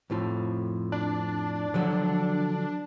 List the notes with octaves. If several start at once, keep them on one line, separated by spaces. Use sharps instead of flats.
F2 A2 F3
D4
D3 F3 F#3